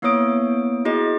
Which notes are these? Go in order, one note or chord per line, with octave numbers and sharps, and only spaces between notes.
A#3 B3 E4 C#5 D#6 D7
E4 F#4 G#4 D#5